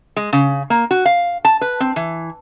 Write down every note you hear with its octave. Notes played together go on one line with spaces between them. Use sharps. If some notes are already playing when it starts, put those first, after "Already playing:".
G#3
C#3
A#3
F#4
F5
A5
B4
C4
E3